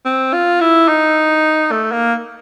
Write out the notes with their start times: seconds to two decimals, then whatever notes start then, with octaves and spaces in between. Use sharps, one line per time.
0.05 C4
0.33 F4
0.61 E4
0.88 D#4
1.72 A3
1.92 A#3